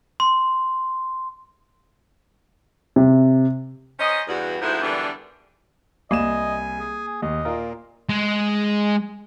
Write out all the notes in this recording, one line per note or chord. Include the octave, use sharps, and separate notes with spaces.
C6
C3
C#4 A#4 C5 D#5
E2 G2 F#4
D2 G#2 F3 B3 E4 C5
F#2 D3 E3 G3 B3 D4
C2 A#3 D#5 G#5 E7
G#4
D#2 D#5
A#2 F4 A#4
G#3